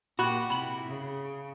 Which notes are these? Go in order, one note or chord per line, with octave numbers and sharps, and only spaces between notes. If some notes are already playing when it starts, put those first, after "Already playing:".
A#2 F#4 G4 B5 F#6 F#7
C3 E4 B5 F#7
C#3